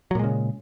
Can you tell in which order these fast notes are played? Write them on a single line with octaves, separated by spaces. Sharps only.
F#3 A#2 G#3 C#3